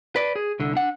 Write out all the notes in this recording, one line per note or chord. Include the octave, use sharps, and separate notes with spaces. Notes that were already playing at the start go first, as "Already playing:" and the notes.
B4 D5
G#4
C2 D3
D4 F#5